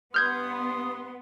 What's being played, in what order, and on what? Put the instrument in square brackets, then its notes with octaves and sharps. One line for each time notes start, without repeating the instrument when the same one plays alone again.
[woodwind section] G2 C6 [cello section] B3 [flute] D#6 [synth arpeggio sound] F6 G6 G#6